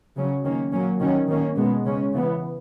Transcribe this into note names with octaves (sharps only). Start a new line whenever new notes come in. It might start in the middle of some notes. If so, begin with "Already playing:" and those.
C#3 F#3 C#4
D#3 A#3 C#4
A#2 F#3 A#3 C#4
D#3 F#3 C#4
D#3 A#3 C#4
B2 G#3 B3
C#3 G#3 C#4
C#3 E3 B3